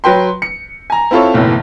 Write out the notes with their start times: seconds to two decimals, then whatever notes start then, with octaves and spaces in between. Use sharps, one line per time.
0.04 F#3 B4 G5 C6
0.42 C#7
0.90 G#5 A#5
1.11 C4 E4 F4 A4 C#5
1.34 F#1 B1 A2 E3